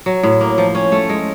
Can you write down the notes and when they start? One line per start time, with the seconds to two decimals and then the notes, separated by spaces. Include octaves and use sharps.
0.06 F#3
0.23 A2
0.41 A#3
0.58 F3
0.75 C#4
0.92 A3
1.09 G#3